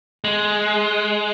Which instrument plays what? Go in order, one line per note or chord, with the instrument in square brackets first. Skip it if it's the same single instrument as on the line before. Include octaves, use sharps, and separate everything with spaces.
[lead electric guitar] G#3